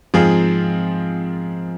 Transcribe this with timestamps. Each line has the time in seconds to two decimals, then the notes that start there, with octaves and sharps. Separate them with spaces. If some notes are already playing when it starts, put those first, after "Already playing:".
0.14 G#2 F3 C4 F4 G#4